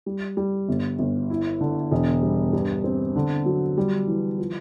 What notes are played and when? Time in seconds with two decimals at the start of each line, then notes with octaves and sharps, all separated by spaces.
0.06 G3
0.37 G3
0.68 G1
0.99 G1
1.30 E4
1.61 D3
1.91 E1
2.23 G3
2.53 G2
2.84 C4
3.16 D3
3.46 F#3
3.77 G3
4.07 E3
4.38 F3